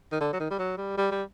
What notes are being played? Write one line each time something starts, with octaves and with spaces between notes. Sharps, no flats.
D#3
D3
F#3
D#3
G3
F#3
G3
G3
G3